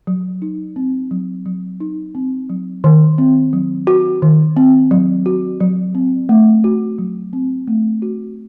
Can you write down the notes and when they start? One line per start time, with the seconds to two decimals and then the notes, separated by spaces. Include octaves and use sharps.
0.07 F#3
0.42 D#4
0.76 C4
1.11 F#3
1.46 F#3
1.80 D#4
2.15 C4
2.50 F#3
2.84 D#3
3.18 C4
3.53 F#3
3.87 F#4
4.22 D#3
4.57 C4
4.91 F#3
5.26 F#4
5.60 F#3
5.95 C4
6.29 A3
6.64 F#4
6.99 F#3
7.33 C4
7.68 A3
8.02 F#4